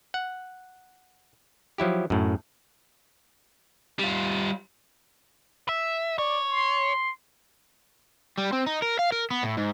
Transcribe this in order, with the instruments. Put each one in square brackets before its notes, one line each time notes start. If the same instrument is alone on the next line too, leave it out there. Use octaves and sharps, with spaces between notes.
[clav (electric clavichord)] F#5
F3 F#3 E4 G4
F#2 A2
[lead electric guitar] G3 F4
E5
[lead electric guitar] C#5 [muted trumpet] D5
[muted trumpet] C6
[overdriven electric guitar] G3
C4
D#4
A#4
F5
A#4
B3
A2
G#2